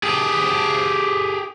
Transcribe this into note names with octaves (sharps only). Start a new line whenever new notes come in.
G4 G#4